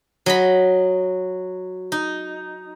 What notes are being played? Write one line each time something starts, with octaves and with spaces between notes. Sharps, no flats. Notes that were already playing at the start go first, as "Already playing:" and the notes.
F#3 D#5 B5
D#4